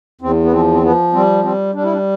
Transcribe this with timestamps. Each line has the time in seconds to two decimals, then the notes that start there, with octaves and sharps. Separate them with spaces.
0.21 E2 C4
0.44 B3
0.52 F3 C4
0.72 C4
0.83 F3 B3
1.13 G3 C4
1.44 G3 C4
1.74 G3 D4
1.84 E4
1.93 D4